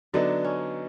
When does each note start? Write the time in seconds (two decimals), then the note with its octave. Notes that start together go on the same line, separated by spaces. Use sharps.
0.13 D3 F#3 B3 D4 D#4
0.45 C#4